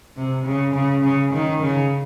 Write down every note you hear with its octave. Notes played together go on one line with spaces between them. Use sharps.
C3
C#3
C#3
C#3
D#3
C#3